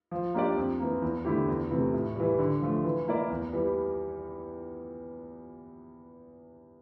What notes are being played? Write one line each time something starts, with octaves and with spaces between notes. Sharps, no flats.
F3
A#3 D4 G4 D5
F2
E3 A#3
E2
D3 A3 E4 G4
E2
C3 E3 A3
A2
E3 G3
D3
F3 A3
E3
A#3 E4 A#4 D5
E2
E3 G3